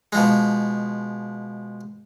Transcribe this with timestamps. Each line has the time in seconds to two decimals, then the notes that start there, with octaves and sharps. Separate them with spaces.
0.13 B2 F3 G#3